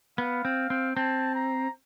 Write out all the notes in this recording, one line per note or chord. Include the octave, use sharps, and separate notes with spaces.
B3 F5
C4
C4
C4 A5
A#5